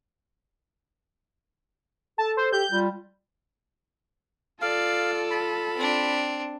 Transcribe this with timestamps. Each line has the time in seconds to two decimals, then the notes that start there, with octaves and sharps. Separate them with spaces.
2.18 A4 A5
2.37 C5
2.52 G4 G6
2.71 G3 F4
4.61 F4 A4 D5 F5
5.31 B5
5.75 C4 D4